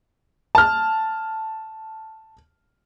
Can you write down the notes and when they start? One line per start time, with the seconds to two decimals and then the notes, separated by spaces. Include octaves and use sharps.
0.55 A5 F6